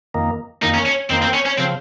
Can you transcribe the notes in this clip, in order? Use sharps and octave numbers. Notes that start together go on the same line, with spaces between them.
F2 D#3 A#3
F2 D#3 A#3 D#4
C#4
C#4
F2 D#3 A#3 C4
C4
C#4
C#4
C#3 F3 C4